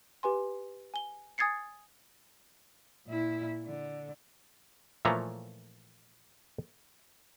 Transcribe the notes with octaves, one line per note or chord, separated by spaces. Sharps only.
G4 B4 G#5 C6
G#5 G7
G#5 D#6 G#6 A6 C7 C#7
A#2 E4
D3
A#2 E3 F3 A3 C#5 A#5